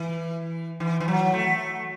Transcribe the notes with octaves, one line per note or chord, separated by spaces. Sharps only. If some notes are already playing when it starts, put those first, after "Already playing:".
Already playing: E3
E3
E3
F#3
A3